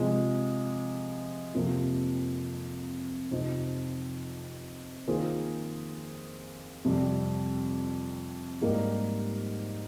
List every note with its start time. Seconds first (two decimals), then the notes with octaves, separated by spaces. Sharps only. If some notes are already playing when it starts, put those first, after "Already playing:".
Already playing: C3 F3 G#3
1.54 F2 C3 F3 A#3 F4
3.31 F2 C3 F3 C4 D#4
5.07 D#3 A#3 F4 G#4 C5
6.85 F2 C3 G3
8.61 G#2 G3 A#3 D#4 G4